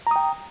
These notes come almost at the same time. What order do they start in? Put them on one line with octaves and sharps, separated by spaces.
A#5 D#6 G5